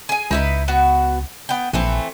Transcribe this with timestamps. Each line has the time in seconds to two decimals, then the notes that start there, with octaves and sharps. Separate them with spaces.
0.09 G#4 G#5
0.31 C#2 D#4 E4 B4
0.68 B3 F#4
1.49 B3 G5
1.73 A#1 E3 A3 C4